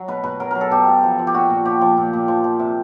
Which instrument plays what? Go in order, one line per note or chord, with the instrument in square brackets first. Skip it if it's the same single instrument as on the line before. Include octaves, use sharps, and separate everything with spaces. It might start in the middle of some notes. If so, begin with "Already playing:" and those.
Already playing: [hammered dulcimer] F#3
B2 B4
B2 B4
F#3 A#4
F#3 A#4
A4
B2 G4
B2
F3
F3
G4
A#2 F#4
A#2
F3 G4
F3
A#2
A#2
F3
F3
C3